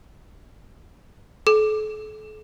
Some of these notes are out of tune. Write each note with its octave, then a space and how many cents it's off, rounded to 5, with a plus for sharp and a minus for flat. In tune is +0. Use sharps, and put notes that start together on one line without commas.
A4 -40